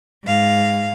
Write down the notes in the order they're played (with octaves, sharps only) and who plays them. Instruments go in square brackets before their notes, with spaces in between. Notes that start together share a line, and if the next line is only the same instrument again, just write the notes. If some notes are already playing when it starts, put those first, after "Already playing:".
[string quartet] G#2 F5